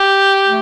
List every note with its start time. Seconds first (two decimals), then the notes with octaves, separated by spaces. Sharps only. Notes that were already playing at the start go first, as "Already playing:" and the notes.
Already playing: G4
0.46 A3